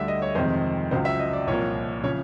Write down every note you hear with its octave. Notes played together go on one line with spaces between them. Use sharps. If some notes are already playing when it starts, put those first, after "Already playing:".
Already playing: D2 D3 G3 E5
D#5
C#5
F2 C3 D#3 G#3 C5
C#2 C#3 F#3 C5
E5
D#5
D5
C2 A#2 F3 A#3 C#5
C#3 F3 C#5